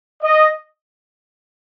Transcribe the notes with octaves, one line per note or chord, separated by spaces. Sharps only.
D#5